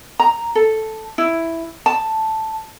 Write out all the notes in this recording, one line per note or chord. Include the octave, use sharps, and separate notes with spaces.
A#5
A4
E4
A5